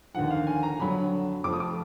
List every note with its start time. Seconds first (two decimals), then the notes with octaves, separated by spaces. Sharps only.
0.14 D#2 D3 F3 F#5
0.31 F5
0.47 G#5
0.63 A#5
0.80 F2 D3 F#3 B5
1.44 F1 F2 F3 D6
1.53 D#6
1.60 D6